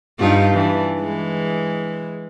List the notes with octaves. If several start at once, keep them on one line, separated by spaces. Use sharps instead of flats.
G2 D#4 F4
E3 D4
E3 G#3